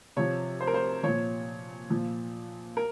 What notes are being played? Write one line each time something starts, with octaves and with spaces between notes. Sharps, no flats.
C3 F3 C#5
C5
A#4
C5
A#2 F3 C#5
A#2 F3
A#4